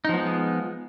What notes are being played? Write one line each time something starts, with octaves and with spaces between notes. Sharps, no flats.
F3 G#3 B3 D#4